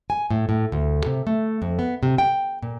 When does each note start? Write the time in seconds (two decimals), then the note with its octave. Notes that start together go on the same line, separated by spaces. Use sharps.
0.10 G#5
0.31 A2
0.49 A2
0.72 D2
1.06 C3
1.27 A3
1.62 F2
1.79 B3
2.03 C3
2.18 G5
2.62 A#2